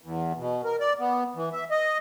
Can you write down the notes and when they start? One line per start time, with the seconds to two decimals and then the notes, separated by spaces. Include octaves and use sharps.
0.02 E2
0.38 B2
0.64 A#4
0.80 D5
0.99 B3
1.36 E3
1.53 E5
1.71 D#5